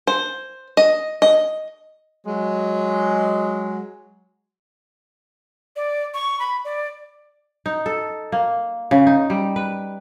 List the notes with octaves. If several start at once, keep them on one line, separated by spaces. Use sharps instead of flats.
C5
D#5
D#5
F#3 G#3
D5
C#6
B5
D5
D#4
A4
A#3
C#3
D#4
G3
B4